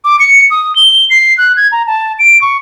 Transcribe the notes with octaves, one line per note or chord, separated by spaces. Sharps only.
D6
C#7
D#6
G7
C7
F#6
G#6
A#5
A5
D7
C#6